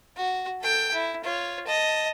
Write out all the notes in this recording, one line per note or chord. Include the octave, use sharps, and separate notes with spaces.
F#4
A4 G5
E4
F4 C#5
D#5 A5